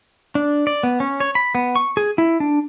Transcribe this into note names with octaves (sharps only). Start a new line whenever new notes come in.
D4
D5
B3
C#4
C#5
B5
B3
C#6
G#4
E4
D4